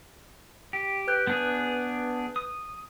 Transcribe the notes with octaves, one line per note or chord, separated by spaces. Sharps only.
G4
B4 F#6 G6
B3 D4 G#4
D#6